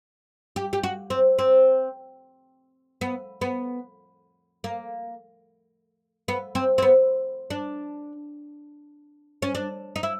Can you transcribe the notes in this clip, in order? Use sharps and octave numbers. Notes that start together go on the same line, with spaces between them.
G4
G4
F#4
C4
C4
B3
B3
A#3
B3
C4
C4
B3
D4
C#4
D4
D#4
E4